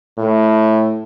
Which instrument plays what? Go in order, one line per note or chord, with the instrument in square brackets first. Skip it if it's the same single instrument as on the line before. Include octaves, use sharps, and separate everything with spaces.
[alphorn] A2